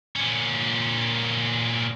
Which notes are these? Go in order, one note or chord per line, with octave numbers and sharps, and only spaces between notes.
A#2 C#4